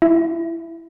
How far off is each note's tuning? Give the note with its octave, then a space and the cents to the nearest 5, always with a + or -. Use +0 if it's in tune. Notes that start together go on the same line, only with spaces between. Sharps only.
E4 +10